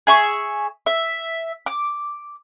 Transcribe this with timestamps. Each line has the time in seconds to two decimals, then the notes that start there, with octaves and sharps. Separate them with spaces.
0.07 G#4 E5 C#6
0.86 E5
1.66 D6